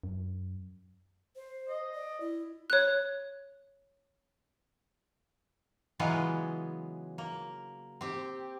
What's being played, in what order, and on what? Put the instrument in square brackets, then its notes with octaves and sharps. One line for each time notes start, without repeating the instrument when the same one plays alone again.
[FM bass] F#2
[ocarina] C5
[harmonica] D#5
[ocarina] D5
E4
[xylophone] C#5 F#6
[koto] C#3 E3 F#3 G#3 B3 F4
A#3
C4 G4